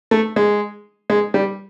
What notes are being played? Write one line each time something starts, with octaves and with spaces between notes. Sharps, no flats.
A3
G#3
G#3
G3